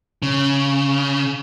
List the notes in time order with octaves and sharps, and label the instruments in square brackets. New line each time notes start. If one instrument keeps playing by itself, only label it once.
[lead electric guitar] C#3